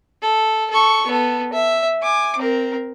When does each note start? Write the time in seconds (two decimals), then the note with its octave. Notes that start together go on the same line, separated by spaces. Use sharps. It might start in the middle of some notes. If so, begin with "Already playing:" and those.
0.22 A4
0.70 A4 C#6
1.07 B3 A4
1.53 E5
2.02 G#5 D6
2.37 C4 A#4